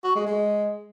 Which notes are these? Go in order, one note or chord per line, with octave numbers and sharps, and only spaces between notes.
F#4
G#3
G#3